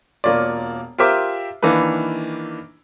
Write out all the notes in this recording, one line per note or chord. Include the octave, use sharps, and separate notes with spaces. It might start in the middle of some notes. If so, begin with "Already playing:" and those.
E1 A#3 F4 C#5 D5
F4 G4 A#4 C5 E5 D6
D#3 E3 A#3 D4 B4